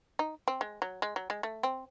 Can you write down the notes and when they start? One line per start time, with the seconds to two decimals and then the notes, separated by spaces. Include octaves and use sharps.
0.19 D#4
0.48 C4
0.61 G#3
0.82 F#3
1.02 G#3
1.16 F#3
1.30 G#3
1.43 A3
1.63 C4